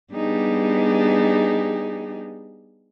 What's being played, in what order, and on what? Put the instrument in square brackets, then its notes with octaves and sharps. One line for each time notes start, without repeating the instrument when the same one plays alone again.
[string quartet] G3 B3 D4 D#4 G4 G#4